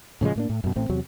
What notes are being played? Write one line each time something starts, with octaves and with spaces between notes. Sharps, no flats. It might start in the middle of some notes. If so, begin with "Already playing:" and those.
A2 C#3 F3 G#3
A2 A#3 D4
A2
F#2 B2
A1 A2 C4
E2 C3 F#3